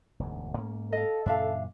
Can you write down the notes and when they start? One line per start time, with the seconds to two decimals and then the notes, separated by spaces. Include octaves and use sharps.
0.19 E1 D2 G#2
0.57 G#2 A#3 C#4
0.93 A4 D#5 F5
1.26 F#2 A#2 C#3 D4 E5 F5